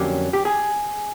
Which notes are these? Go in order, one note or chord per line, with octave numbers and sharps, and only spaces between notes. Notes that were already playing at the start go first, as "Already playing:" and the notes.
Already playing: F2 D3 F#3 A#3 C#4 G4
G4
G#4